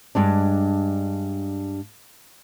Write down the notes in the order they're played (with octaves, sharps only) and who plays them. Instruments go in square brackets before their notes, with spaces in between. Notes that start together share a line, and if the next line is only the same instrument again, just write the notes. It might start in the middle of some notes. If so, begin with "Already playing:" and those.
[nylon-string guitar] G2 G#3 D4